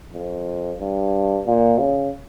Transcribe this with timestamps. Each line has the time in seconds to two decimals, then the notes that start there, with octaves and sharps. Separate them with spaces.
0.13 F2
0.80 G2
1.46 A#2
1.79 C#3